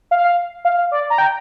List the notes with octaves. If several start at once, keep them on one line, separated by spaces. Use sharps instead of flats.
F5
F5
D5
A#5
G5